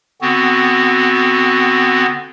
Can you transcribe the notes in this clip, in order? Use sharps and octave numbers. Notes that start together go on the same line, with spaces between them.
D3 B3 C4 F#4